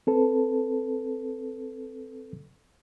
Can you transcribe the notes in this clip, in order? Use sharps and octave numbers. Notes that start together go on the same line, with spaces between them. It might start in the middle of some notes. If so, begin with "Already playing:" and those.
C4 A4 B4